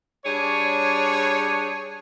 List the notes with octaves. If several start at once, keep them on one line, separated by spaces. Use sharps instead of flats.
G3 D4 G#4 C#5